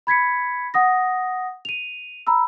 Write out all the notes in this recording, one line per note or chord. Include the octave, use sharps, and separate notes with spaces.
B5 G#6 B6 C#7
F#5 D#6 A#6
D#7 F7
A#5 B5 E6